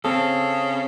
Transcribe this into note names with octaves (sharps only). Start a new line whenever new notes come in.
C#3 C4 A4